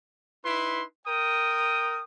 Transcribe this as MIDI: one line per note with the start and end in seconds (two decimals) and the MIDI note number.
0.44 0.84 63
0.44 0.84 64
0.44 0.84 71
0.44 0.84 84
1.06 2.02 70
1.06 2.02 79
1.06 2.02 87